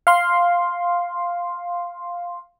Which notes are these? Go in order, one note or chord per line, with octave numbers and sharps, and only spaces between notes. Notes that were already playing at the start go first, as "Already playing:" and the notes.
F5 C6